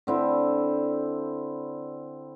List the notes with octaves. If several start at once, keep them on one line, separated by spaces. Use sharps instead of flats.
D3 C4 E4